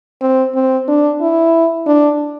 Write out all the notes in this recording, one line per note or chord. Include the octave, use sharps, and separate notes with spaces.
C4
C4
D4
E4
D4